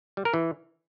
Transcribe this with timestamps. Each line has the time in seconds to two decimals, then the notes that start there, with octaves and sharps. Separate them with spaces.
0.17 G3
0.25 A#4
0.34 E3